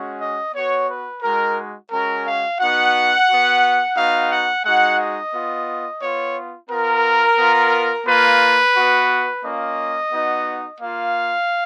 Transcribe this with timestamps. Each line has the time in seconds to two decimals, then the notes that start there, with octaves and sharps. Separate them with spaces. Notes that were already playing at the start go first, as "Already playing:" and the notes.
Already playing: G#3 C#4 F#4
0.20 D#5
0.54 B3 F#4 C#5
0.88 B4
1.23 G#3 D#4 F#4 A#4
1.91 G#3 C#4 F#4 A#4
2.26 F5
2.60 B3 D#4 F#4 F#5
3.28 F#4
3.33 B3
3.97 B3 D#4 F#4 F5
4.31 F#5
4.65 G#3 D#4 F#4 F#5
5.00 D#5
5.33 B3 F4
6.02 B3 F4 C#5
6.70 B3 F4 A#4
7.39 B3 F4
8.07 A#3 F4 B4
8.76 B3 F#4
9.44 A#3 C#4 F4 D#5
10.13 B3 D#4 F#4
10.81 A#3 F4 F5